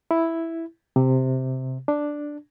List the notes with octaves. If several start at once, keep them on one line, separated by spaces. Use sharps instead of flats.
E4
C3
D4